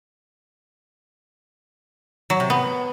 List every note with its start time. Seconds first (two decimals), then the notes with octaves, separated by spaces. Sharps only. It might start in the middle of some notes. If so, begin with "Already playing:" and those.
2.30 F#3
2.40 C3
2.50 B3